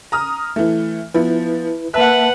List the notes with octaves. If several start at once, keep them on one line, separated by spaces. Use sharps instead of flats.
A#5 D#6 F6
E3 A3
F3 B3 E4 B4
A#3 B4 E5 F#5 A5 F#6